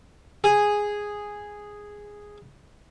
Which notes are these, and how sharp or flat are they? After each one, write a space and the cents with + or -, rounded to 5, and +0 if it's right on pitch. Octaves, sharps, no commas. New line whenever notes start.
G#4 -5